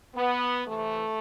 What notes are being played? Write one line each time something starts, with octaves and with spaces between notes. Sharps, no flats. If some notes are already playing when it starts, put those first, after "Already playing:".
B3
C3 E3 A3